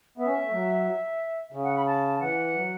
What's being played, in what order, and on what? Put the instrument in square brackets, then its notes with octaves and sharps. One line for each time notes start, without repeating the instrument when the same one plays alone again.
[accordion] B3 [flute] E5
[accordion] C#4
A3
F#3
C#3
[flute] F#5
B5
A5
[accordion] E3 [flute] F#5
[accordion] F#3